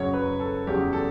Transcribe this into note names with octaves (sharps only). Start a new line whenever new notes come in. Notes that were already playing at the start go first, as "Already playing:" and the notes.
Already playing: F#2 C#3 F#3 C#5
B4
A4
E2 C#3 F#3 G4
A4